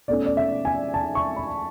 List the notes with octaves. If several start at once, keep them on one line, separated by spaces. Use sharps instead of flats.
B2 A3 C#4 D5
D5
E5
G#5
A5
C#6
B5